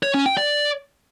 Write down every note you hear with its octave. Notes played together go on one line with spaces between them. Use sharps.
C#5
C#4
G5
D5